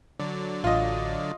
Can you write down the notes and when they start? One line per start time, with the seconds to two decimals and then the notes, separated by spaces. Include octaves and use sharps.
0.20 D3 F#3 D5
0.64 A1 F4 D#5